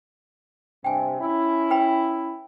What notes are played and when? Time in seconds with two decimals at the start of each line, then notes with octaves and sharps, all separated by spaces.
0.84 G2 C3 G5 G#5
1.21 C#4 E4
1.71 B4 G5 B5